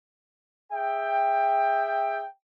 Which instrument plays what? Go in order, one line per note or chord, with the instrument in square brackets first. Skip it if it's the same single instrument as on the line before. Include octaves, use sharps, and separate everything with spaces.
[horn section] G#4 E5 G5